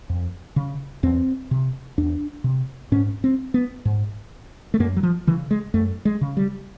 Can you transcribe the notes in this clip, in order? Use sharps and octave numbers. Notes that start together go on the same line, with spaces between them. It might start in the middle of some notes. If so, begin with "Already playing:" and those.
F2
C#3
E2 C4
C3
E2 D4
C3
G#2 C#4
C4
B3
G#2
A3
F#2 A#3
F#3
F3
C#3 E3
G#3
F#2 A3
G#3
C#3
G3